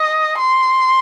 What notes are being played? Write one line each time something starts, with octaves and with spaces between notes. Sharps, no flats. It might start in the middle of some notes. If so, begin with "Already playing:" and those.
Already playing: D#5
C6